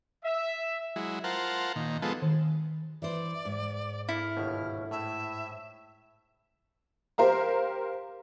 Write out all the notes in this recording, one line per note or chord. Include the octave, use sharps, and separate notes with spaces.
E5
F#3 G#3 E4
F4 A#4 C5 F#5 A5
A#2 D#3
F3 G#3 B3 A4
D#3
E3 C5 D5
G#2
E4 A4 F6
G1 D#2 B2
A2 E5
G4 A#4 C5 F5 A#5